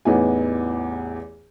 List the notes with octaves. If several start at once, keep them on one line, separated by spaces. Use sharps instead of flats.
A1 E2 B3 D#4 G#5